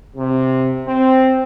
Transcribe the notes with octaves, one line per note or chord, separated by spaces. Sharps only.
C3
C4